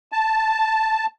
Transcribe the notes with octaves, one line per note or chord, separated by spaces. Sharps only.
A5